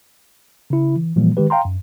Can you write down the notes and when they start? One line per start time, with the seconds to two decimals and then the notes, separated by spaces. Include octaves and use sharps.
0.70 C#3 E4
0.96 E3
1.16 A#2 E3 F3 G3 A#3
1.37 D#3 G#3 G4 B4
1.50 F5 G5 A#5 C6
1.65 F#2